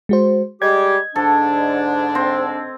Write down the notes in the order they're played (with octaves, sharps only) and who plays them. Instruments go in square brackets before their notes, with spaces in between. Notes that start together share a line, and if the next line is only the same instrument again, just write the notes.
[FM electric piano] G#3 F#4 C5
[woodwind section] G3 G#3 G4 [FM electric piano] D#5 G#6
[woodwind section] G#2 D3 D4 [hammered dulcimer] A4
[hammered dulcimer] C4